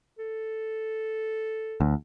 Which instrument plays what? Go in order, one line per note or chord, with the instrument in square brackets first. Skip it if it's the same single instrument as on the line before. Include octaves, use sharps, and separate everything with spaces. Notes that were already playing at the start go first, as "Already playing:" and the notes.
[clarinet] A4
[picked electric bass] D2